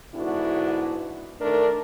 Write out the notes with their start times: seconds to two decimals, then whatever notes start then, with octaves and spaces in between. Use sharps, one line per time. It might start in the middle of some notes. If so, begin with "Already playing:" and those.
0.15 G#2 D3 B3 D4 E4 F#4
1.40 D#3 A3 D4 A#4